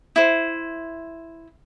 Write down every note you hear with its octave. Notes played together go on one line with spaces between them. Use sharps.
E4 C5